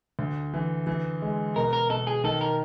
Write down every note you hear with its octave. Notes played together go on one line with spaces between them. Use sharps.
D2
E3
E3
G#3
B2 A#4
A#4
B2 A4
G#4
D#3 A4
A#4